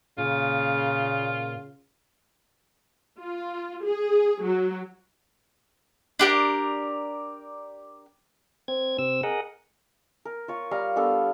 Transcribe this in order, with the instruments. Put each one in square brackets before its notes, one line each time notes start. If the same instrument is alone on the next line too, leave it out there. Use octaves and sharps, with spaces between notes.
[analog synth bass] A#2 [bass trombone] C#3 [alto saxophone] F4
[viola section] F4
G#4
F#3
[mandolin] D4 G4 A#4
[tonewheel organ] C4 G#6
C3 C4 E6
G#4 A#4 D#5 F#5
[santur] A#4
F4 C#5
G3 F5 A#5
G3 B3 D4 A4